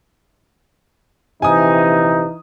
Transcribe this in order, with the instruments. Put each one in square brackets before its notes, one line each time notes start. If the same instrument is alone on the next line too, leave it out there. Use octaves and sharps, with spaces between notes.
[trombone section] A#1 C3 [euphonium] E3 [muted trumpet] D#4 [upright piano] G#5 D#6